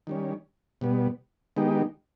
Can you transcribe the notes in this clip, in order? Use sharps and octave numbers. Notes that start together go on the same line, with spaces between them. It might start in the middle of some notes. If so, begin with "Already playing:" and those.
D#3 G3 C#4
B2 G3 B3
D#3 G#3 B3 D#4 G4